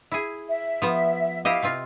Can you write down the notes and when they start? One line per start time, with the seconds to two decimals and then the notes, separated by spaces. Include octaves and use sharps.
0.11 E4 G#4
0.49 E5
0.82 F3 B3
1.45 E4 G4 D#5 F5
1.62 C3 C4 F4